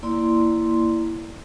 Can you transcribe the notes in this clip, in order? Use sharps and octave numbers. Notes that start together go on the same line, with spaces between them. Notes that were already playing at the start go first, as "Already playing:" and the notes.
A#3 E4 D5 C6